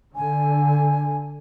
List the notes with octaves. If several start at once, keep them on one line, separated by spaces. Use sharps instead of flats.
D3 G#5